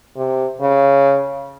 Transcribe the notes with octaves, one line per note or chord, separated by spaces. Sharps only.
C3
C#3